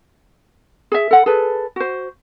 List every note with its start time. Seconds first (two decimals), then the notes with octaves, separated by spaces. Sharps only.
0.92 G#4 E5
1.11 A4 F#5
1.26 G#4 A4 B4
1.76 F#4 C5